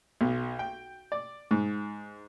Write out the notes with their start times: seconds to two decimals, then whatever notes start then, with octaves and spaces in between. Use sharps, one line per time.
0.21 B1
0.59 G5
1.12 D5
1.51 G#2